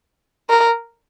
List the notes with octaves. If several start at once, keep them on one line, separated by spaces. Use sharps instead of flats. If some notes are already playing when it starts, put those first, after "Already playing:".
A#4